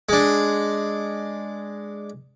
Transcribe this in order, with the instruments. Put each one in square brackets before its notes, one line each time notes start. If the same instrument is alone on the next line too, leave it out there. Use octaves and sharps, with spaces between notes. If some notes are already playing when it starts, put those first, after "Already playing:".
[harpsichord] G#3 D4